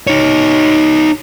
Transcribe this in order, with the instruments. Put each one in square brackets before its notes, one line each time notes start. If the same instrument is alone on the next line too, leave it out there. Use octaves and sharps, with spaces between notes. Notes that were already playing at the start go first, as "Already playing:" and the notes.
[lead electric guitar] D#4 C#5